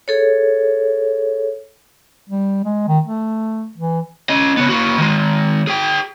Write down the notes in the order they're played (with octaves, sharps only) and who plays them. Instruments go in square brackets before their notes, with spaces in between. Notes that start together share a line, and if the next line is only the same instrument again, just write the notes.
[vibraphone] G#4 A4 C#5
[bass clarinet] G3
G#3
D#3
A3
E3
[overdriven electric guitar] C#4 D#5
C#3 B3
A#3 F#4
D#3 G#3
G#4 G5